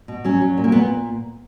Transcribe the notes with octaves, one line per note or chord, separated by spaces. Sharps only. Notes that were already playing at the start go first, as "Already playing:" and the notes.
B2
F#3 C#4
F#3
A#2
A#3
A#2 B3